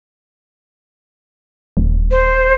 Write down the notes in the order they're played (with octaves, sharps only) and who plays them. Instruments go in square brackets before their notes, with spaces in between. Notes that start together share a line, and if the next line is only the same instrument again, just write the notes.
[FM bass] D#1
[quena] C5